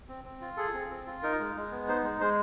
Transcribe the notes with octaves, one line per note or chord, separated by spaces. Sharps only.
C4
C4
F4
G#4 A4
C4
C4
F4
D#4 A#4
G#3
G#3
B3
D#4 C5
G#3
G#3 C5